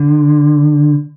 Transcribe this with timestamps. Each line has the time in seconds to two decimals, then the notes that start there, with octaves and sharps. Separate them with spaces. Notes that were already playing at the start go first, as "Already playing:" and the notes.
Already playing: D3